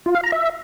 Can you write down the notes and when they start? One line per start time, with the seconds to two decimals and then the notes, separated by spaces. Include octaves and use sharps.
0.06 F4
0.15 F5
0.23 A#5
0.32 E5